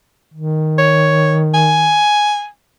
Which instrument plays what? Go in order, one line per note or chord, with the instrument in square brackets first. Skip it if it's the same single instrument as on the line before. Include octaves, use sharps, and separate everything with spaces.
[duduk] D#3
[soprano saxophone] C#5
G#5